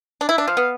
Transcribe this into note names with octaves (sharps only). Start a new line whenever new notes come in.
D4
E4 E5
D4
F3 F5
B3